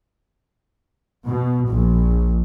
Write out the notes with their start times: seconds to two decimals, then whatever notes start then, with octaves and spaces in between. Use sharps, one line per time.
1.26 B2
1.70 A#1